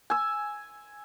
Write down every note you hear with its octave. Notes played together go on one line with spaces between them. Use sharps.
G#5 E6